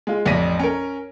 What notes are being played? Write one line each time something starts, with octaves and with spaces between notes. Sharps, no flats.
G#3 F4
A1 F2 D5 A#6 B6 D#7
C#4 A#4